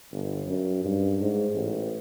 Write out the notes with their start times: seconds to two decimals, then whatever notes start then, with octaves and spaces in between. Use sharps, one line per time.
0.12 G1
0.47 F#2
0.85 G2
1.21 G#2
1.55 A1